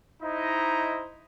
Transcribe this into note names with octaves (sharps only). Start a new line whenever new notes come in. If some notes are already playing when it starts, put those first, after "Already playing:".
D#4 E4 C5 D#5 A#5